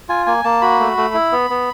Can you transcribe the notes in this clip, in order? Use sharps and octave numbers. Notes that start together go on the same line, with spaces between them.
F4 G#5
A#3 G#5
A#3 A5
F#4 B5
A3
A3
E4
B3
B3